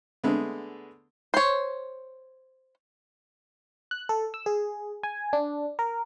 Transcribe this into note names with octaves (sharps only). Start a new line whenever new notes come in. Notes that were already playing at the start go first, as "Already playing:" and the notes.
D3 G#3 A3 B3
C5 C#5
F#6
A4
E6
G#4
G#5
D4
A#4